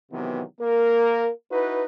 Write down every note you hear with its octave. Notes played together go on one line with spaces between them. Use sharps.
C3 D#3 E3 F#3 B3
A#3 A#4
D#4 E4 F#4 B4